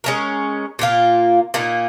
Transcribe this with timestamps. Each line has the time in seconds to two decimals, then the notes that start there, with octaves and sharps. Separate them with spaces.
0.04 G#3 C#4 A#4
0.79 A#2 A#3 F4
1.54 A#2 A#3 D#4